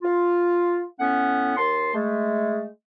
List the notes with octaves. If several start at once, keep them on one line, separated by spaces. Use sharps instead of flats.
F4
A2 B3 C#4 F#5
D#2 A5 C6
G#3 A3